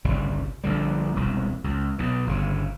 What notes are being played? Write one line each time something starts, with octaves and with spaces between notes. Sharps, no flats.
G1 C2 C#3 G3
A#1 D3 G3
E1 C2
C#2
B1 B2
G1 C#3